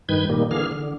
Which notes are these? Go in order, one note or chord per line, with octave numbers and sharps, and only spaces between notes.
G2 D#3 B4 G6 G#6
A#2 D#3 G3 A#3
D3 E3 A#3 G#4 F6
D3